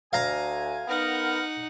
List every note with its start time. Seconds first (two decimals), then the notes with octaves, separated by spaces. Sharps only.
0.13 D2 F5 G#5 A#5
0.88 B3 D#4 A#4 F#5